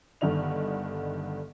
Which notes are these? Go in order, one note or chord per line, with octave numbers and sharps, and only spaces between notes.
G1 G2 D3 D#3 D#5 F7